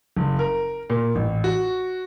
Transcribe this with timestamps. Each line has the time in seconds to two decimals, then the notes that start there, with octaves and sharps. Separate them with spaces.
0.17 F#1
0.39 A#4
0.90 A#2
1.15 A1
1.44 F#4